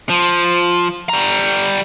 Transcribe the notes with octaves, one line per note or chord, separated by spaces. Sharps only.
F3
G3 A#5